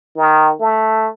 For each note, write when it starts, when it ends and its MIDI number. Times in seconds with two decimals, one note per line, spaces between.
0.16 0.54 51
0.60 1.07 57